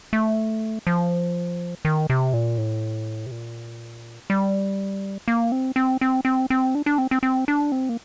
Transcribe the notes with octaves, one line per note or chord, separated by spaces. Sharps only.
A3
F3
D#3
C3
A#2
A2
C3
A#2
G3
A#3
C4
C4
C4
C4
C4
D4
D4
C4
C4
C4
D4
C4
A#3